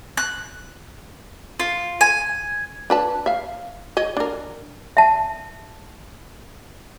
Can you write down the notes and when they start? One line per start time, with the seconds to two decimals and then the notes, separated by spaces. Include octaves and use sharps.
0.17 F#6
1.60 F4
2.01 G#5
2.90 D4 B4 A5
3.26 E5 F5
3.97 C#5 D#5
4.17 D4 A#4
4.97 E5 A5